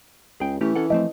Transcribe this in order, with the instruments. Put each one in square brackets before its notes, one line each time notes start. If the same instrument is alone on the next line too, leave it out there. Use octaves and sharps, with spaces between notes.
[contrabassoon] C#2 [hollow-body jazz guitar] G#4 G5
[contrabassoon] E3 [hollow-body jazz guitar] A3 C#4 G4
[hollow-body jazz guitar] C#4 A4 F#5
[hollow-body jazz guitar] F3 A3 C4 [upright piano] D#5